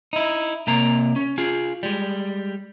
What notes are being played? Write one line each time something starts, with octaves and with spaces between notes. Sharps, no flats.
D#4 E4
C3 A#3 A#5
C#4
F4 G#4
G3 G#3